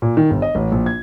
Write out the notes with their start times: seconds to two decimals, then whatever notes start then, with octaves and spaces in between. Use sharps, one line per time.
0.02 A#2
0.17 D#3
0.30 G1
0.42 D#5
0.55 A1
0.72 A#1
0.86 G#6